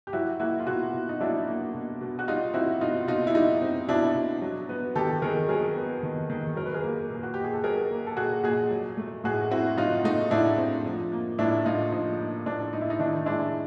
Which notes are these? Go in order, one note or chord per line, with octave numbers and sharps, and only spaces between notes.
G4
F#3 E4 F#4
A#3 E4 F#4
F4
B2 E4 F#4
B2
D#4
F#3 D4 E4
A#3
B2
B2
F#4
G3 D#4 F4
C4 E4 F#4
B2 D#4 F4
B2 D#4 F4
E4
G3 D#4
C4
B2 D4 E4
B2
F#3
B3
D#3 G4 A4
D#3 G#4 A#4
F#3 G#4 A#4
B3
D#3
D#3
F#3 A#4
B4
G#4 A#4
A#3
A#2
F#4
A#2 G4
G#4
A4
F#3 G#4 A#4
A#3
A4
A#2 F#4 G#4
A#2 F#4 G#4
F#3
A3
A2 F#4 G#4
C4 E4 F#4
F#3 D#4 F4
A3 D#4
A2 D4 E4
C4
F3
A#3
A2 D4 E4
A2 D#4 F4
F3 D#4
A#3
A2 D4
A2 D#4
E4
D#4
D#3 D4 E4
G#3 D4 E4